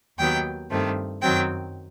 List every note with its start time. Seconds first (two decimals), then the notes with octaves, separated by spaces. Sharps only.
0.18 D#2 D#3 F#3 B3 G5
0.70 G2 D#3 A3 C4
1.22 F#2 D#3 F#3 C4 G5